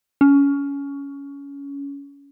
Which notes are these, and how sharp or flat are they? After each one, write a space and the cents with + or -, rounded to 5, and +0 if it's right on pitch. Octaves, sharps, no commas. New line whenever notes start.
C#4 +20